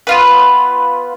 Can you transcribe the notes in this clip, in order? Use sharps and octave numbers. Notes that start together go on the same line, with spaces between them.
B3 F4 B4